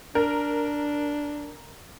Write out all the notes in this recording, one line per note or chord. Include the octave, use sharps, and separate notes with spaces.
D4 A#4